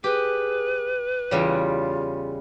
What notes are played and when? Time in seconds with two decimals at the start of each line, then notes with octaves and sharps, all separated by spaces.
0.04 G4 G#4 B4
1.31 E2 C#3 G3 F4